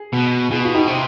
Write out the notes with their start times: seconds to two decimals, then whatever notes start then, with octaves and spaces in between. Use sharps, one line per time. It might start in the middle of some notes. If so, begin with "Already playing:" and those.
Already playing: G#4
0.13 B2
0.50 B2 F4 G#4
0.65 F4
0.74 D#4 G4
0.87 C3